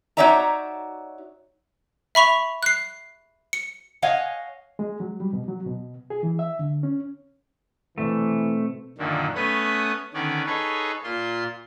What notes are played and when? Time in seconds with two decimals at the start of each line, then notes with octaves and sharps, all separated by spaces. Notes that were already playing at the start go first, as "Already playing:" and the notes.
0.17 D#4 F#4 C#5 D5 E5 A#5
2.15 E5 B5 C#6 F7
2.63 F#6 C7
3.53 C#7
4.02 C#5 D#5 F5 F#5 G#5
4.79 G#3
5.00 F#3
5.20 G3
5.33 B2
5.48 F#3
5.66 B2
6.10 G#4
6.23 E3
6.39 E5
6.59 D3
6.83 C#4
7.98 B2 E3 A3 C4
8.98 F#2 A#2 D3 D#3
9.35 A3 B3 C#4 B4 D#6
10.14 D3 D#3 B3 C#4 D5
10.46 D#4 G#4 A4 B4 C#5
11.04 A#2 F4 C6